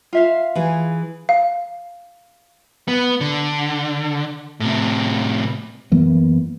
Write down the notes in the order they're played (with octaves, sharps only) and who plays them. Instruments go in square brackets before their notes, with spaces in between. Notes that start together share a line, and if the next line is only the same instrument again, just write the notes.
[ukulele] F4 E5 F5
[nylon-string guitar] E3 G#4
[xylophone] F5
[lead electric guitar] B3
D3
A2 C3
[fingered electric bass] F#2 E3 A#3 B3